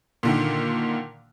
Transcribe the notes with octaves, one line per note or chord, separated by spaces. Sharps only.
A#2 D3 D#3